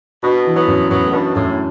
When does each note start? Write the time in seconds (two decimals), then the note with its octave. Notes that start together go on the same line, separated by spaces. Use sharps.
0.23 B2 D4
0.45 E3
0.56 F#3 B3
0.67 F#2
0.91 F#2 F#3 B3
1.03 A2
1.13 B2 D4
1.35 F#2 A2